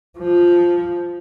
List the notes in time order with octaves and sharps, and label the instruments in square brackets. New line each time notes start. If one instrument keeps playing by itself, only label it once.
[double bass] F3